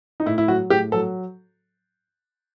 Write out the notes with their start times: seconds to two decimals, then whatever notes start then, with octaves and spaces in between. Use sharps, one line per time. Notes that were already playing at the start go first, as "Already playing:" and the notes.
0.20 D#4
0.26 A2 E4
0.38 E4
0.48 F#3 F#4
0.70 A2 G4
0.92 F#3 A4